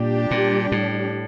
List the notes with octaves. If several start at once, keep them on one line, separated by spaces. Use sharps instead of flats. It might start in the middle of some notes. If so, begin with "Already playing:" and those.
Already playing: A#2 G3 D4 G4
A#2
A2